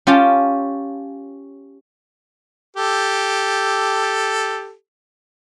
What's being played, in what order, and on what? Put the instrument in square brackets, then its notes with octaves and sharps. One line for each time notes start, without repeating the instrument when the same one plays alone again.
[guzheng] C#4 F4 G4 G5 A5
[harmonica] G4 A4